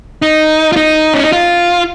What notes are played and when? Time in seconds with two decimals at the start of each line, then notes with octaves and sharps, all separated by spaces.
0.22 D#4
0.72 F4
0.76 D#4
1.14 C#4
1.23 D#4
1.32 F4